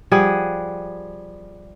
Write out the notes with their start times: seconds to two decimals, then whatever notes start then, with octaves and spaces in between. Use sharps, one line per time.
0.12 F3 G3 G#4 F#5